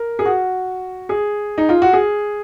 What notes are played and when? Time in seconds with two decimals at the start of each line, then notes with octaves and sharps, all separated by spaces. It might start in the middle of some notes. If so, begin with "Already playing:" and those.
Already playing: A#4
0.19 G#4
0.25 F#4
1.09 G#4
1.58 D#4
1.69 F4
1.82 F#4
1.93 G#4